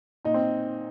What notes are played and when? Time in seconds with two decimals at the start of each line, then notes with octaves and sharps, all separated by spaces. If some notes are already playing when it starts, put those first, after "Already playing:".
0.25 A#2 D#4
0.34 C4